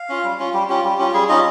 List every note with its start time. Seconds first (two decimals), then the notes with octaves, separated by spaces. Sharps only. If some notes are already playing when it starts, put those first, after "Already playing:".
Already playing: F5
0.09 C#4 F4
0.24 G3
0.39 C#4 F4
0.54 G3 G4
0.69 C#4 F4 G4
0.84 G3 G4
0.99 C#4 F4
1.14 G3 G#4
1.29 C#4 D#4 F4 D#5